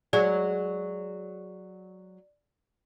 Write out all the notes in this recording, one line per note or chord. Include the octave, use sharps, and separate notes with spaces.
F#3 G#3 F#4 D5